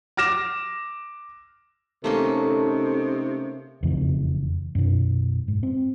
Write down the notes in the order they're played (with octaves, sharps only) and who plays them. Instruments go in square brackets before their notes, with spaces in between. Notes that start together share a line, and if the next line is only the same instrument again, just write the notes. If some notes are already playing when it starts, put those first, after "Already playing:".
[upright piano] D6 F6 A#6 E7
[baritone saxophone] C3 [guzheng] A3 A#3 C#4 [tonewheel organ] D#4 [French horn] A4
[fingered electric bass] E1 F2 C#3 E3
F#2 B2
G#2
C4